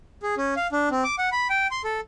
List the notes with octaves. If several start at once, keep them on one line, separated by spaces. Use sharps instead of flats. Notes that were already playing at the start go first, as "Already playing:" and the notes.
G#4
C#4
F5
D4
C4
D6
F#5
B5
G5
C6
A4